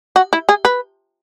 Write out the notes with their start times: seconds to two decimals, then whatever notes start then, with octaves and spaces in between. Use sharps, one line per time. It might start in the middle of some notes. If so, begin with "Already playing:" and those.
0.16 F#4
0.33 E4
0.49 G#4
0.65 B4